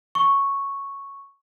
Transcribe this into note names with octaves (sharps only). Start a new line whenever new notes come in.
C#6